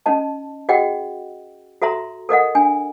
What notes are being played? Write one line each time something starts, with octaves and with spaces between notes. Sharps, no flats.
C#4 D#4 D#5 A5
F#4 G#4 D#5 F#5 G5
F#4 A4 E5 A#5 C6
A4 A#4 D#5 F#5
D4 G#5